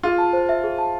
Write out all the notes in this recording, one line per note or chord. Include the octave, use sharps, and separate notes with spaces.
F4 G#4
A5
C5
E5
G#4
A5